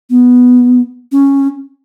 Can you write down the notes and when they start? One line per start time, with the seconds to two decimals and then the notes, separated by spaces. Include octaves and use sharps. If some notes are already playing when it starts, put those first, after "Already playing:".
0.10 B3
1.12 C#4